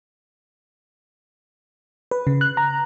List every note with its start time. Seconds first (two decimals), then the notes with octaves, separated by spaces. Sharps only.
2.11 B4
2.27 C#3
2.41 F#6
2.57 A#5